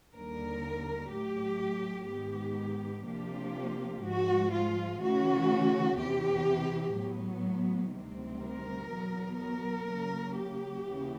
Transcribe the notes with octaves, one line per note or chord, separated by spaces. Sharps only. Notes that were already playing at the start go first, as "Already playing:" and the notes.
D#2 D3 G3 A#4
A2 F#3 A3 G4
G#2 D#3 G#3 B3 G4
C3 F3 A#3 D4 F4 G4
G#2 F3 G#3 F#4
F4
C#3 E3 A3 C#4 F#4
E2 C3 E3 G4
A2 F#3 B3
D2 C3 D#3 G3 C4
A#4
E2 B2 F#3 B3
A#4
C#3 F#3 A#3
G4
D#2 C#3 E3